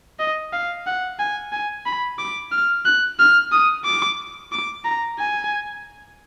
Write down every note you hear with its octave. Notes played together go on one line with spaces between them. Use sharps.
D#5
F5
F#5
G#5
G#5
B5
D6
F6
F#6
F6
D#6
D6
D6
A#5
G#5